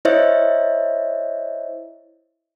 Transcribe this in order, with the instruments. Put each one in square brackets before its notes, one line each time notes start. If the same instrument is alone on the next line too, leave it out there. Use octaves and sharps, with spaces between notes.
[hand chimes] E4 C5 C#5 D#5 E5